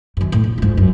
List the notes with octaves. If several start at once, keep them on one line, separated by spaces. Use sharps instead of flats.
F#2 D#3
A2
A#1
F2 G#2
F#2